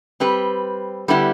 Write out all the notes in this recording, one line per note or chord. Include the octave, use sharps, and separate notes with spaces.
G3 C4 G4 B4
D3 G3 B3 E4 G4